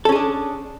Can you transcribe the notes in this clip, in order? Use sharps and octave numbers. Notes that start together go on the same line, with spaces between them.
C#4 D4 G#4 A4